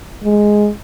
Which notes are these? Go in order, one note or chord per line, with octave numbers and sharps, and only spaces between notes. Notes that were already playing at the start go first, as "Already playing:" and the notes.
G#3